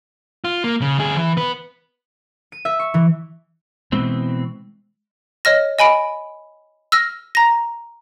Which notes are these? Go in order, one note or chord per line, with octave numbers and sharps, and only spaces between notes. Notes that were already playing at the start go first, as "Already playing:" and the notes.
F4
A#3
C#3
D2 G#4
E3
B3 B4
D#7
E5
C#6
E3
B2 E3 G#3 C4
C#5 D#5 F6 A#6
D#5 G#5 B5 D7
E6 F6 A#6
A#5 A#6